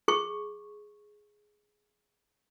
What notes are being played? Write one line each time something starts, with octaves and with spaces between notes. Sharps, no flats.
G#4 C#6